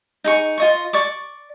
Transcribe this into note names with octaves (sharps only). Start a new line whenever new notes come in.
D#4 G#4 C#6
F4 D#5 C#6
D5 C#6 D6